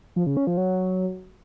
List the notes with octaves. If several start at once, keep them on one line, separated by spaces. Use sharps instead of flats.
F3
C#3
C#4
F3
F#3